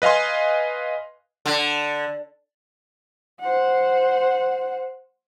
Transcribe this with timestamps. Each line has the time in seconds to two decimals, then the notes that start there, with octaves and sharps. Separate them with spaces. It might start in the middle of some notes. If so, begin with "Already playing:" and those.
0.02 B4 D#5 F5 G#5 C6
1.46 D3
3.40 C5 F#5